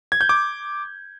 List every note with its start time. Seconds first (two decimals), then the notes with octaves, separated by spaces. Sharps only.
0.12 G#6
0.21 G6
0.29 D6